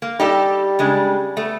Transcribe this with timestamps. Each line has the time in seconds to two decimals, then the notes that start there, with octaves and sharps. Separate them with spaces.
0.02 A#3
0.20 G3 D#4 G4 A4
0.79 C#3 G#3 D4
1.37 A3 B3